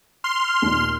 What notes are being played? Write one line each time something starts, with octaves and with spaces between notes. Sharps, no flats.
C6 F6
D#2 A#2